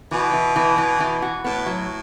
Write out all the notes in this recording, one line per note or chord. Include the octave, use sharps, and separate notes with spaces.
B2 E3
E3
E3
E3
E3
F#4
A2 B3
F#3